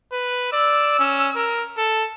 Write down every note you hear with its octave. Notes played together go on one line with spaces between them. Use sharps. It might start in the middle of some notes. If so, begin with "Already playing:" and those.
B4
D5 E6
C#4
A#4
A4